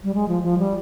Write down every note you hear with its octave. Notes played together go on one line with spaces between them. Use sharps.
G3
G#3
F3
F3
G3